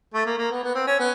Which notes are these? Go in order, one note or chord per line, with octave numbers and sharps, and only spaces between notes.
A3
A#3
A#3
B3
B3
C4
C#4
B3